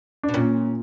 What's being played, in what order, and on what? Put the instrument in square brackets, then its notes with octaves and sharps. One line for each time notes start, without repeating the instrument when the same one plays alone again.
[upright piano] D4
[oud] B2
[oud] A#2 [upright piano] C#4